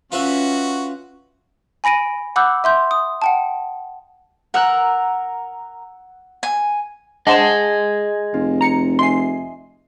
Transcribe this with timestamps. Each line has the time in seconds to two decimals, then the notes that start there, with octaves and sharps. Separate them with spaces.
0.12 C#4 F4 F#4 B4 E5
1.84 G#5 B5 A#6 D7 D#7
2.36 F#5 B5 D6 E6 F#6 G6
2.64 E5 C6 G6
2.91 D#6
3.22 F#5 G5 A5
4.54 A#4 F#5 E6 F#6
6.43 G#5
7.27 D4 G#4 C5 D#5 F#5 G5 A5
8.34 F1 F4
8.61 A#5 C#7
8.99 D#4 E5 G#5 C6 C7